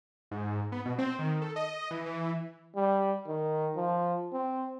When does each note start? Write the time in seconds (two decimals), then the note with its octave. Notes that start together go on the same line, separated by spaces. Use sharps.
0.31 G#2
0.72 B3
0.86 B2
0.98 C4
1.19 D#3
1.42 A4
1.56 D#5
1.91 E3
2.06 E3
2.76 G3
3.28 D#3
3.76 F3
4.33 C4